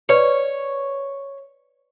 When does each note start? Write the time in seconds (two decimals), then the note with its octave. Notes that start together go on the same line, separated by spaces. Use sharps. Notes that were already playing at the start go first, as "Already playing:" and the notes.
0.09 B4 C#5 D5